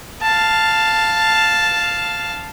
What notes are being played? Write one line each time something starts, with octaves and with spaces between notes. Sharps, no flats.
F5 A5